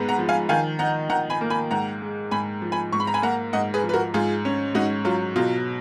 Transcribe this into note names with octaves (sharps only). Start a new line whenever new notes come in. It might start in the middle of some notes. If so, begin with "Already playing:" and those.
Already playing: G#2 G#3 B3
F#5 A#5
F3
F5 G#5
D#3 F5 G#5
D#4 F#5 A#5
D#3 F#5 A#5
G#5 B5
A#3
G#5 B5
G#2 F#5 A#5
G#3
G#2 G#5 B5
F3
G#5 B5
G#2 C#6
B5
A#5
G#5 B5
A#3 F#5 A#5
G#2 D#5 F#5
G#4 B4
F3
B4
F#4 A#4
G#2 F4 G#4
C#4
G#2 D#4 F#4
F#3 F4
B2 F4